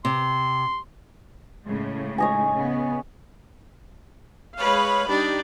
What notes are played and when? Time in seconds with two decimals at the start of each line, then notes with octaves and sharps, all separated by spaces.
0.05 C3 C6
1.65 A2 C#3 G#3
2.18 C#5 D#5 G#5
2.54 C#3 B3
4.57 G#3 B4 C#5 F5 B5
5.09 G3 D4 D#4 G4